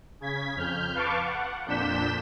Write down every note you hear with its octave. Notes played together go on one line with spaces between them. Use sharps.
C#3 G#6 B6
F2 F6 G6
B4 F5 A5 C#6 D6
F#5
F2 A#2 D4 G6 B6 E7